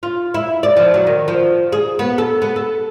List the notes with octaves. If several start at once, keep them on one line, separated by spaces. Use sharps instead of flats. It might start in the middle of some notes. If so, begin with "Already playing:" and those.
F4
E4
D5
F3
F#3
D#3
F3
G#4
B3
A4
B3
A4